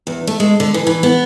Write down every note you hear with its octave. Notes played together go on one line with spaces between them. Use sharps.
E2
A3
G#3
D3
E3
E3
B3